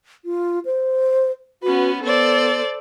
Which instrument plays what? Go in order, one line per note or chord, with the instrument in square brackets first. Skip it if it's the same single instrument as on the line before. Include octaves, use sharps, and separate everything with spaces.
[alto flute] F4
C5
[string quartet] B3 C#4 B4 [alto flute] F#4
[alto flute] B3 [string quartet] A4 C5 D5